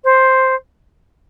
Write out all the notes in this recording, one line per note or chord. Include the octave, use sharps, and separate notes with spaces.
C5